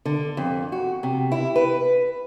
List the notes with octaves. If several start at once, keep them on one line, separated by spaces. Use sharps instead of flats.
D3
F2
F#4
C3
E4
B4